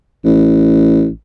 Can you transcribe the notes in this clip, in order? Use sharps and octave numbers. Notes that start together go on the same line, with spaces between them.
A1